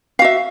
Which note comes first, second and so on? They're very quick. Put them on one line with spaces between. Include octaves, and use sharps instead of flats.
F5 F#4 E5